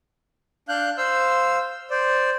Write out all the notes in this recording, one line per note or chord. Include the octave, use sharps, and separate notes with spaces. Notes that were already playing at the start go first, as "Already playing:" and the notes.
D4 F5 F#6 G6
C5 F5 C6 E6
C5 D5